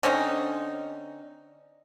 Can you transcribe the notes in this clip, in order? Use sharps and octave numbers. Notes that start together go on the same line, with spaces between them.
D3 C4 C#4 D#4